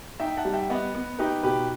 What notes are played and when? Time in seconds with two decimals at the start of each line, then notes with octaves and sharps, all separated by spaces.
0.20 D#4 E5 G5
0.37 F#5 A5
0.45 G3
0.53 E5 G5
0.69 B3 D#5 F#5
0.95 B3
1.19 D#4 G4 B4
1.43 B2 G4 B4